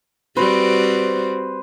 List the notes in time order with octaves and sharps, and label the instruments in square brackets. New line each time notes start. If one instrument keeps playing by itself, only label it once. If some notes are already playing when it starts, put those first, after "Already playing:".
[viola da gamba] G3 C4 F#4 [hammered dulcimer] B4 C5